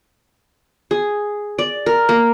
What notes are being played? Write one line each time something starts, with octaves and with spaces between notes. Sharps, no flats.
G#4
D5
A#4
A#3